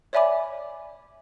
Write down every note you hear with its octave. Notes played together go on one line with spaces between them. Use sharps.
C#5 D5 E5 G#5 B5 D6